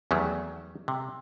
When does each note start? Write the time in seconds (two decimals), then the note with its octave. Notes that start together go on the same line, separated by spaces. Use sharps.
0.11 E2 D#3 F#3 G3 A3
0.88 C3